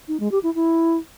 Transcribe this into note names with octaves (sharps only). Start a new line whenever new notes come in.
D#4
G#3
G4
E4
E4